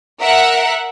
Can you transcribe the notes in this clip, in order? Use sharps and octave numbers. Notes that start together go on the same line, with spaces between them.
A#4 E5 F#5